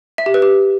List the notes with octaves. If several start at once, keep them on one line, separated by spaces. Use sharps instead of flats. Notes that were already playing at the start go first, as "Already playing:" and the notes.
E5
G4
B4
G4